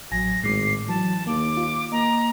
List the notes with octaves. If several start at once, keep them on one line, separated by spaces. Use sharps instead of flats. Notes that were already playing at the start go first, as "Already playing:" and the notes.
A1 F#3 G#5 A#6
G#1 A2 G#3 D6 C7
E3 F#3 A5
D#2 A#3 D6
F4
A#3 D#5 A#5